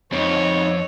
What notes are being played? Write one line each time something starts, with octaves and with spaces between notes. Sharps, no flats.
F2 C4 D#4 C#5